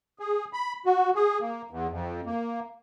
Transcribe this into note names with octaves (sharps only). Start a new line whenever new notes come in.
G#4
B5
F#4
G#4
A#3
E2
F2
A#3